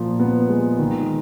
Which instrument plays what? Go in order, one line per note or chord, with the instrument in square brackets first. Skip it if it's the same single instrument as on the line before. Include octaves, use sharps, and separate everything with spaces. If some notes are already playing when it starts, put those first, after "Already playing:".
Already playing: [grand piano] A#2 F3
B3
G#3
D#3